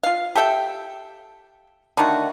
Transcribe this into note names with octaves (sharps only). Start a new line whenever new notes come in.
F4 F5
G4 A4 E5 G5
D3 D#3 A3 F#4